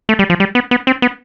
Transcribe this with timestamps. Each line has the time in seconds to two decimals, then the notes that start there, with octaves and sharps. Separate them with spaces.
0.09 A3
0.19 G3
0.30 F3
0.40 G3
0.55 B3
0.71 B3
0.87 C4
1.02 B3